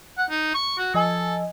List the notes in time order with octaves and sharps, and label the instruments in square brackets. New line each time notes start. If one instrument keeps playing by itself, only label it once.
[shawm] F#5
D#4
C#6
F#4
[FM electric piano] F3 D#5 G#5 [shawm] A4